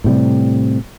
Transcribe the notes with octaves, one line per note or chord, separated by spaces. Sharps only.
A2 C3 G3